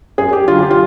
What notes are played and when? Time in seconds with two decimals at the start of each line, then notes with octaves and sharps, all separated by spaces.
0.18 F#2 G#4
0.33 G4
0.47 D3 F#3 F4
0.62 G4
0.71 F4